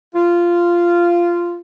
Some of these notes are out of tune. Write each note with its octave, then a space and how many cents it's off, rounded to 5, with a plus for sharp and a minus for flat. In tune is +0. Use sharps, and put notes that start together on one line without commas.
F4 -10